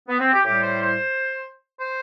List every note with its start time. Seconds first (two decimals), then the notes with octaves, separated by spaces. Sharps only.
0.09 B3
0.21 C4
0.33 G4
0.45 A2 G3 G4
0.62 C5
0.81 C5
1.79 C5